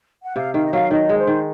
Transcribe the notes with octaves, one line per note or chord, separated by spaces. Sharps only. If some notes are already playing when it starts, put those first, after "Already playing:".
F#5
C3 F5
D#3 F5
D#5
F#3 F5
D#3 D#5
G#3
C5
D#3